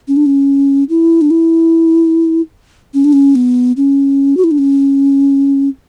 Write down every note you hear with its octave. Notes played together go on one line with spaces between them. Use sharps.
C#4
D4
C#4
E4
D4
E4
C#4
D4
C#4
B3
C#4
F#4
E4
D4
C#4